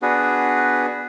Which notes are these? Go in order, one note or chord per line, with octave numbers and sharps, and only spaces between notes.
B3 D4 F#4 G#4 B4